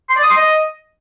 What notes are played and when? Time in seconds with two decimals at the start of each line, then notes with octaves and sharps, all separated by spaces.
0.09 C6
0.16 D5
0.23 D#6
0.29 C6
0.36 D#5